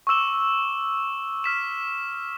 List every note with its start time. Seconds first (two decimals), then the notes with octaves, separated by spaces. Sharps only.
0.07 C#6 D6 E6 E7 G7
1.44 F6 B6 E7